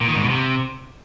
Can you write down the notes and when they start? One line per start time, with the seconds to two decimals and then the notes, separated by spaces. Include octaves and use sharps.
0.01 A#2
0.08 D#3
0.15 G#2
0.22 B2
0.30 C3